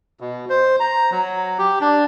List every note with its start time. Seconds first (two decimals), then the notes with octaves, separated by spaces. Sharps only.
0.20 B2
0.49 C5
0.80 A#5
1.11 F#3
1.58 G4
1.81 D4